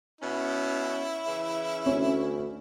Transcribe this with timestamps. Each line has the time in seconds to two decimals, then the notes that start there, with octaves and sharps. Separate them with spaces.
0.21 B2 C#4 E4
1.26 C#3 E3 E5
1.86 D2 C#4